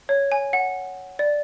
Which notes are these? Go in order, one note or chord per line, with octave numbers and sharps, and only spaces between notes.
C#5
G#5
F#5
D5